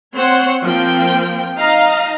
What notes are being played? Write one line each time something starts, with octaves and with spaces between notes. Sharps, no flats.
C4 C5 C#5 F#5
F3 A#3 C4 G5
D#4 D#5 F5 A#5